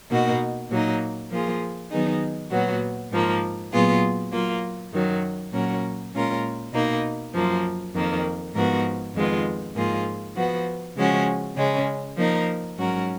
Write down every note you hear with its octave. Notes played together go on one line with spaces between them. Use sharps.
B2 A#3 D#4 F#4
A#2 F#3 A#3 D#4
F3 A#3 F4 G#4
D#3 F#3 B3 D#4 G#4
A#2 F#3 B3 F#4
G#2 F3 A#3
A#2 F#3 B3 F4 G#4
F#3 A#3 F4
F#2 D#3 F#3
A#2 F#3 C#4 F#4 A#4
A#2 G#3 C#4 F4 A#4
B2 A#3 D#4
F#2 F3 A#3
F2 D#3 A#3
G#2 F3 B3 F#4 A#4
F2 D#3 G#3 B3 F4
G#2 F3 A#3 F4 G#4
F3 B3 F#4
C#3 F3 G#3 C#4 F#4
C#3 G#3 C#4
F3 A#3 D#4 A#4
G#2 F#3 C#4 F#4 A#4